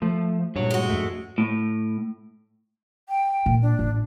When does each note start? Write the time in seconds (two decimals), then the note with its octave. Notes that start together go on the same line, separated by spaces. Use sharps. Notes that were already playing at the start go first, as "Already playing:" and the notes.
0.02 F3 A3
0.56 G2 A#2 F#3 C#5
0.71 G#3 F#4
0.90 F2 G#2 A3
1.38 A2
3.09 G5
3.46 A#2
3.62 D4
3.79 A1